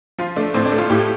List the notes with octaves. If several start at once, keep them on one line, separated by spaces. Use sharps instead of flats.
F3 F4
A3 D4
A2 C4
D4
A3
F4
A2 G4